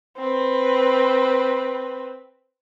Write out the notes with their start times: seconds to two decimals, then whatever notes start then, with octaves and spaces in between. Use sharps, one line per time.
0.18 C4 B4